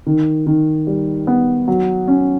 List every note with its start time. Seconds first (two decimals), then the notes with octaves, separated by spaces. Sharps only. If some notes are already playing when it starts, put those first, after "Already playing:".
0.07 D#3
0.47 D#3
0.87 G3
1.27 B3
1.68 F#3
2.08 C#4